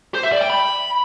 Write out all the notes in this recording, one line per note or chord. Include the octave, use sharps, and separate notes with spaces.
C5
E5
D5
G5
B5